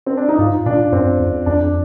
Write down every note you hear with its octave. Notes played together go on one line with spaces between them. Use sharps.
C4
D4
D#4
G#2 F4
A#2 D4
G2 C4
F2
F2 D4